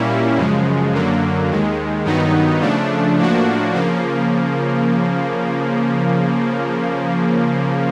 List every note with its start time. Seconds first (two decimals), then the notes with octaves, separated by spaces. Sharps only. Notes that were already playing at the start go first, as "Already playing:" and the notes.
Already playing: A#2 G3 A#3 C#4 E4
0.37 F#2 C#3 F3 G#3
0.93 F#2 D3 F#3 A#3
1.50 D#2 D#3 G#3
2.05 G2 D#3 F#3 B3 D#4
2.61 C#3 F3 A3 D4
3.18 A2 F3 A#3 D4 F#4
3.74 C#3 F3 A#3